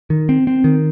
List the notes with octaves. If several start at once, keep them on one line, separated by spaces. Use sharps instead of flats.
D#3
C4
C4
D#3